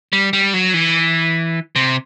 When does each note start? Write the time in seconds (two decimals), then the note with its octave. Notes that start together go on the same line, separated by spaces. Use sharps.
0.13 G3
0.33 G3
0.54 F#3
0.74 E3
1.76 C3